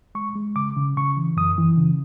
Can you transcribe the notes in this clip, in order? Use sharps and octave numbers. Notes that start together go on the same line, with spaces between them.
G#3 C#6
G#3
C#3 D6
C#3
C#3 C#6
E3
F#2 D#6
E3
C#3